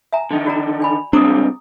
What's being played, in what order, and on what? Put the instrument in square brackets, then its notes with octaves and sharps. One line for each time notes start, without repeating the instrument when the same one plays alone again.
[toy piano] E5 G#5 A#5
[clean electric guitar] D3 D#3
[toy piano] F#4 D5 A#5
D5 G#5 B5
[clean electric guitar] C#2 G2 C4 [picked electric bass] D4 [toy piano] A#5 D6 D#6